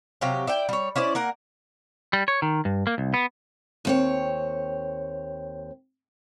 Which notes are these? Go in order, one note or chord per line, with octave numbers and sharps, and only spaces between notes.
C3 F#3 G4 F5
E4 D5 G5
G3 C#5
C#4 E4 C5 D5
A#3 A#4 F#5
G3
C#5
D#3
G2
A#3
C2
B3
D#2 C4 C#5